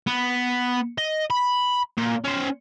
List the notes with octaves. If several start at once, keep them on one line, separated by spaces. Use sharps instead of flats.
B3
D#5
B5
A#2
C#4 C5